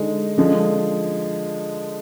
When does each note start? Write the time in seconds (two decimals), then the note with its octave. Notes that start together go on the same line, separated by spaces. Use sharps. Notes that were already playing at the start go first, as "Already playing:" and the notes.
Already playing: D3 G#3 D#4
0.38 D3 F3 G#3